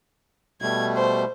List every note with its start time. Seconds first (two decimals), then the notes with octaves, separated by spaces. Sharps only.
0.62 B2 G3 A3 G#6
0.97 C5